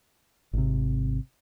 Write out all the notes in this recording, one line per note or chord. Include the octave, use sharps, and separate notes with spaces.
G#1 C3